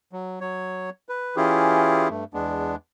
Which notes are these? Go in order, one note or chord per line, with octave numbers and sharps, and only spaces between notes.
F#3
F#3 C#5
B4
E3 C#4 E4 F4 G4 G#4
G2 A3
E2 G#3 B3 D4